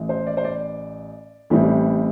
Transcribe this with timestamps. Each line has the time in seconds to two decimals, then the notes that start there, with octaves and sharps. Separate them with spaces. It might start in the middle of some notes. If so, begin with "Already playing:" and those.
Already playing: A1 A2 E3
0.09 C5
0.27 D5
0.37 C5
0.45 D5
1.50 A1 A2 E3 G3 C4